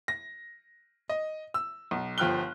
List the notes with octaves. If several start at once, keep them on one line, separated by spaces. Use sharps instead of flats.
A#6
D#5
E6
B1
G1 F3 G5 F6 F#6 G7